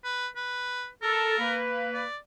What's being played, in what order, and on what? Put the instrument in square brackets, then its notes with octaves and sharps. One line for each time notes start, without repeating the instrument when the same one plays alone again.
[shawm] B4
B4
[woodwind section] A4 [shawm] A#4
[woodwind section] A#3 B4
[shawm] D5